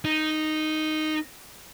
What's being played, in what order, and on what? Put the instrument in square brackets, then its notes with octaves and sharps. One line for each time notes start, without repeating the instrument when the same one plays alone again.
[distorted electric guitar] D#4